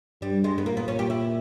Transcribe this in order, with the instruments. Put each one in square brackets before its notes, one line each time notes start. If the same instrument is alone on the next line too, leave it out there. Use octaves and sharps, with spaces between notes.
[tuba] G2 [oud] G3
[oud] G#3
B3
[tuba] A#2 [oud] A#3
[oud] B3
C#4
G4
E4